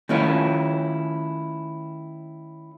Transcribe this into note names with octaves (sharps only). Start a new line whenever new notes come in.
D#3 A3 C#4 E4 F4